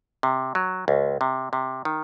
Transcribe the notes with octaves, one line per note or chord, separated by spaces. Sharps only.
C3
F#3
C#2
C3
C3
D#3